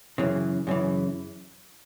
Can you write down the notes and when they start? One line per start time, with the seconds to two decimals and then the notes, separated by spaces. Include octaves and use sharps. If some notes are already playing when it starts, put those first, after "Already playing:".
0.18 F#2 C#3 E3
0.67 F#2 C#3 E3